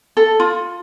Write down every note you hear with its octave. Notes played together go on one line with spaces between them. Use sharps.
A4
F4